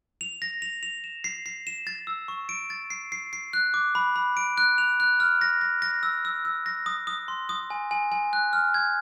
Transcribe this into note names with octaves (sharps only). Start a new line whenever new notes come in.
F7
A#6
F7
F7
E7
C7
C7
E7
A6
E6
C#6
D7
A6
C7
C7
C7
F#6
D6
B5
B5
D7
F#6
F7
F#6
F6
A#6
A#6
A#6
E6
E6
E6
A#6
D#6
D#6
C6
D#6
G#5
G#5
G#5
F#6
F6
G#6